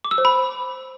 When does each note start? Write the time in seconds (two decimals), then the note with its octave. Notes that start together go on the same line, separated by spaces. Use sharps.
0.05 D6
0.11 E6
0.18 C5
0.25 B5